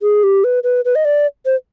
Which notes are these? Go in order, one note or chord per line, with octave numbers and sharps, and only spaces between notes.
G#4
G4
B4
B4
B4
D#5
D5
C5